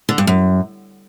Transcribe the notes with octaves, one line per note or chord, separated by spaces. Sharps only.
D3
G2
F#2